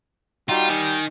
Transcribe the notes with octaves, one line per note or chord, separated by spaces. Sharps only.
G3 D#4 F4 F#4 G5
D#3 G#5 D#6